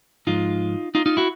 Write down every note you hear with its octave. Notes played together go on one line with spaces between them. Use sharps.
G#2 F3 G#3 D#4 F4
D#4 F4
D#4 F4
E4 F#4